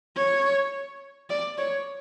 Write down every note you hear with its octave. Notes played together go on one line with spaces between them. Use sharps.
C#5
D5
C#5